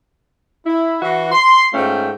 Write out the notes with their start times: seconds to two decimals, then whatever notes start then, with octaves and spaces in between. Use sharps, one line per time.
0.66 E4
1.02 E3 F#4
1.32 C6
1.74 G#2 A3 C#4 F4 G5